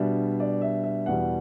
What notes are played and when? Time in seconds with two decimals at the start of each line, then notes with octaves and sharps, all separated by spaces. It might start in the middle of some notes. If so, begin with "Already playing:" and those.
Already playing: B2 G3 D4 E5
0.40 D5
0.61 E5
0.84 E5
1.06 E2 B2 G3 F#5